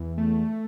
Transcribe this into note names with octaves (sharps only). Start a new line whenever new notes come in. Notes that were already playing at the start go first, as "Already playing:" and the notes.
Already playing: E2
A3